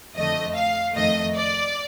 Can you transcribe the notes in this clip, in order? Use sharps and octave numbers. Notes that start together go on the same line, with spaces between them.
F2 D3 A3 D#5
F5
F2 D#3 A3 D#5
D5